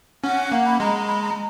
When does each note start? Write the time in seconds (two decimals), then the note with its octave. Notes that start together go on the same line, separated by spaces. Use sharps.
0.24 C#4 F#5
0.52 A#3
0.66 B5
0.80 G#3 A#5
1.07 B5
1.22 A#5